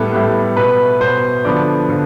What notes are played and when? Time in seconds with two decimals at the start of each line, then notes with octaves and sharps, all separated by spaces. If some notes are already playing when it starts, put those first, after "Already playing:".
Already playing: A2 G3 B3 A4
0.12 A2 G3 B3
0.57 B2 B3 B4
1.01 B2 B3 C5
1.45 D3 F3 B3 D5
1.89 D3 F3